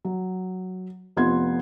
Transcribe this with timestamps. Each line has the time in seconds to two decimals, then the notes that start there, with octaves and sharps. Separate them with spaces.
0.05 F#3
1.17 F1 F2 B3 F4 C6 G#6